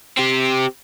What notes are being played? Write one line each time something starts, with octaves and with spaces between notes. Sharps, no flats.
C4 G4